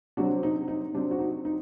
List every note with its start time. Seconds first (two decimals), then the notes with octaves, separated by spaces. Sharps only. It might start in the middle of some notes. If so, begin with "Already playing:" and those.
0.17 C3 F#3 C4 D4 F#4
0.43 D#4
0.68 D#4
0.93 C3 F#3 C4 D4
1.11 F#4
1.19 D#4
1.45 D#4